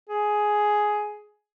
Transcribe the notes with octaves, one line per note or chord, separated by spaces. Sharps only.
G#4